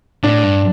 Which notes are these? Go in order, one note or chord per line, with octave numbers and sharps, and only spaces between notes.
A2 D4
G2